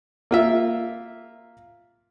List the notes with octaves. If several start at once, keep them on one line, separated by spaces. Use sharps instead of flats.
A#3 F4 E5